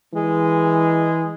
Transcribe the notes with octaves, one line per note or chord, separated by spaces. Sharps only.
E3 G#3